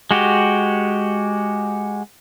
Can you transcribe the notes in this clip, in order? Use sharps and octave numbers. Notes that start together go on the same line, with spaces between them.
G#3 F#4 G4